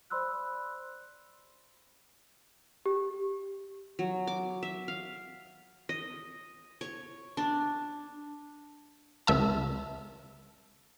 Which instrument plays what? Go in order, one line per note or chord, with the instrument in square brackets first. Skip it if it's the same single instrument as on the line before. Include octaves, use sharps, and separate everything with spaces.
[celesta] C5 D5 B5 C6 E6 F#6
G4
[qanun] F#3
D6
E5
F5
D#5
C#5
D4
[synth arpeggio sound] C#2 E5 A5